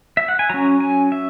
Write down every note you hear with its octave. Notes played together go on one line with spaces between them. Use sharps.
E5
F#5
G#5
F#3 C#4 A#5
G#5
E5